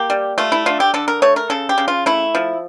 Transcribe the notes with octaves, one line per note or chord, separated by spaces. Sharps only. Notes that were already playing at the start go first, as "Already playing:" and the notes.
Already playing: A#3 G4
G3
A3 F4
E4
D3 F4
G4
D3 A4
A#4
A3 C#5
A#4
C#3 A4
G4
C#3
F4
A3 E4
F3